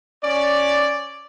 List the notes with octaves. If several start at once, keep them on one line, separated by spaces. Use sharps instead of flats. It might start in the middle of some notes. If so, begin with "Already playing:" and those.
C#4 D5